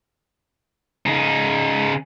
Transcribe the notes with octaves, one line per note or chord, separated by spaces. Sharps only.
C#3 D#4